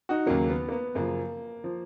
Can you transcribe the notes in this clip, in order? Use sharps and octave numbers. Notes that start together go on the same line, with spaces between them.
D#4 F#4
D#2 C#3 F#3 A#3
B3
A#3
B3
F#2 C#3 F3 A#3
F3